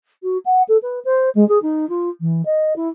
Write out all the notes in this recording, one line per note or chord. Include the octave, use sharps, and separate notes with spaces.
F#4
F#5
A4
B4
C5
G#3
G#4
D#4
F4
E3
D#5
E4